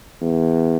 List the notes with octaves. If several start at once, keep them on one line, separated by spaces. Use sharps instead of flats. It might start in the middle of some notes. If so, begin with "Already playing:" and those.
E2